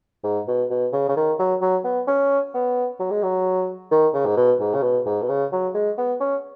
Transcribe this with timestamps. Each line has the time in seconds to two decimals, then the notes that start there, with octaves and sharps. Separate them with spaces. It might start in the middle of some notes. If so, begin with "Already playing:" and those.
0.24 G#2
0.48 B2
0.70 B2
0.92 C#3
1.09 C#3
1.16 D#3
1.39 F#3
1.61 F#3
1.84 B3
2.07 C#4
2.54 B3
2.99 F#3
3.10 G#3
3.23 F#3
3.91 D#3
4.14 C#3
4.25 G#2
4.36 B2
4.60 G#2
4.74 C#3
4.82 B2
5.06 G#2
5.22 B2
5.29 C#3
5.52 F#3
5.74 G#3
5.98 B3
6.20 C#4